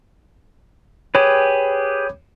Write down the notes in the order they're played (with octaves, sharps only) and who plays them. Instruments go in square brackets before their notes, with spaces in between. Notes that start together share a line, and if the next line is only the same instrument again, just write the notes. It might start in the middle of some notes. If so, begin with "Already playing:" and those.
[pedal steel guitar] G4 G#4 B4 [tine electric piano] C#5